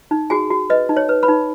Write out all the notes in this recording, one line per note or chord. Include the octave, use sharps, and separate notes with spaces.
D#4
F#4 G#4 G#5
F#4
B4 D#5
D#4
C#5
B4
B4 B5
D#4